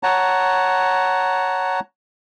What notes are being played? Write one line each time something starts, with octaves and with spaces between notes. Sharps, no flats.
C#5 F#5 A5 A#5